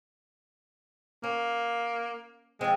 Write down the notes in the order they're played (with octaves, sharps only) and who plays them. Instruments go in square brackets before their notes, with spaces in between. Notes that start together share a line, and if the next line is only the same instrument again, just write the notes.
[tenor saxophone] A#3 [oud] C#4
[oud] F3 C4 [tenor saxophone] G#3